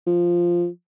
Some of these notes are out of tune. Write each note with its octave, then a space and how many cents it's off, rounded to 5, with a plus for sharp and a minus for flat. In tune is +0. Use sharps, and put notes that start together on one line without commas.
F3 -5